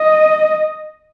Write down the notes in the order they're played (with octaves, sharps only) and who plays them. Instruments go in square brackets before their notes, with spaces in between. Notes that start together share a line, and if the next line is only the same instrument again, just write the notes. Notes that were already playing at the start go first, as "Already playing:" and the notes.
Already playing: [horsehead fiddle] D#5